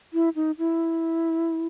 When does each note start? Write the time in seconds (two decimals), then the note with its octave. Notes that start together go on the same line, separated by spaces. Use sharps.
0.13 E4
0.35 D#4
0.58 E4